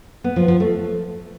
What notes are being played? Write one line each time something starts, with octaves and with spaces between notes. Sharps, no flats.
B3
F3
F3
A3